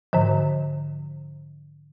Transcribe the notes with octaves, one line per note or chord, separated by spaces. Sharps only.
G#2 D3 F3